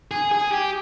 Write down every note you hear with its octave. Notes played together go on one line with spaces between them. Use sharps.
G#4
G#4
G4